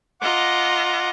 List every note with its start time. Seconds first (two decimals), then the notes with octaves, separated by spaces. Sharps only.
0.21 F4 D#5 F#5 A#5 D6